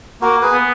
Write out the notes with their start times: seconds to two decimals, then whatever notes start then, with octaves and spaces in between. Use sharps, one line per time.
0.22 A#3 F#4 A#4
0.42 G#4 B4
0.52 B3